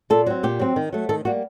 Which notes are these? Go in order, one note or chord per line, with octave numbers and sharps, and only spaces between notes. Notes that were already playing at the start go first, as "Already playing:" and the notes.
A#2 A4
F#3 C4
A#2 G4
F#3 C4
D#3
F#3 A3
D#3 A4
G3 A#3 F#4